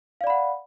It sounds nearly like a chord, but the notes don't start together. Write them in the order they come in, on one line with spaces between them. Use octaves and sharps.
F5 D5 B5 F#5